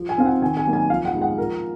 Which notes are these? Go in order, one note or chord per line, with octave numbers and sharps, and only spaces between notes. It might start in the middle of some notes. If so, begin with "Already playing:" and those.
Already playing: F3
G#5
C4 D#4 F5
F#5
D#3 G#5
G#5
F#3 A#3 D#4
G#5
F3 F5
F#5
G#3 D#4
F#5
F3 A#4